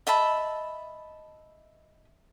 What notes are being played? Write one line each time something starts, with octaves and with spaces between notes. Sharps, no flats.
D#5 E5 A5 B5